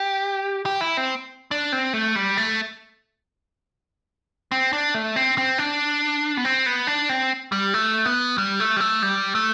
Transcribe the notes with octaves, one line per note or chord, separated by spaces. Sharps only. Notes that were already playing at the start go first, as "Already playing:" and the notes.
Already playing: G4
G4
E4
C4
D4
C4
A3
G3
A3
C4
D4
A3
C4
C4
D4
B3
C4
B3
D4
C4
G3
A3
B3
G3
A3
G3
A3
G3
A3